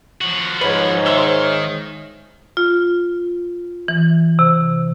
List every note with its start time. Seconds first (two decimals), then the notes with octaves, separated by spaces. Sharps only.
0.21 F3 F#4
0.61 G#2 B4 C#5
1.06 D#3 C5 E5 E6
2.57 F4
3.88 E3
4.39 C3